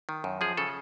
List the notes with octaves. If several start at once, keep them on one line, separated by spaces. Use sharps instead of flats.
D#3
F#2
F3 G#4
C#3 A4